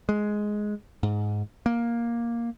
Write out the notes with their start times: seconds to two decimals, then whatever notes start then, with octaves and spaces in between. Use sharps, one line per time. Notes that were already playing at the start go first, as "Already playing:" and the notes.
0.09 G#3
1.03 G#2
1.66 A#3